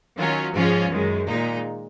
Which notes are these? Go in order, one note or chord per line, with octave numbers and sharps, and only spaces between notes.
D#3 F#3 C#4 F4
G#2 F3 G#3 C#4 F4
F#2 D#3 G#3
A#2 G#3 D#4